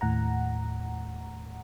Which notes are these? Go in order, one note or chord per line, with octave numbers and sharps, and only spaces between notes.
D#2 A2 F#5 A#5